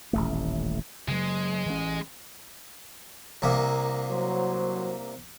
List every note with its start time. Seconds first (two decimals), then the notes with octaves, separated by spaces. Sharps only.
0.13 D#1 A1 A3
1.08 C#3 F#3 G#3
1.66 E3 C#4
3.42 C2 C3 A#3
4.09 F#3 C5